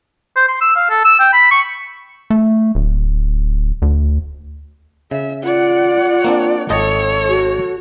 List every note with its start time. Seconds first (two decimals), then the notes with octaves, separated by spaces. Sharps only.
0.37 C5
0.48 C6
0.61 E6
0.76 F5
0.90 A4
1.05 E6
1.20 G5
1.33 B5
1.51 C#6
2.30 A3
2.75 D1
3.82 D2
5.11 C#3 E5
5.44 F4 D5 F#5
6.24 A#3 C4 D4
6.70 G#1 A4 C#5 D#5 A5
7.29 F#4